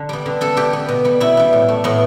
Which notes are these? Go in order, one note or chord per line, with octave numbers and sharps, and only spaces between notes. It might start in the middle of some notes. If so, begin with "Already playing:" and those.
Already playing: D3 A5
G3 B3
D3
B3 A4
D3 G4
B3
B2
G3 B3
B2 E4
G3 B3
A2
A3
A2 B3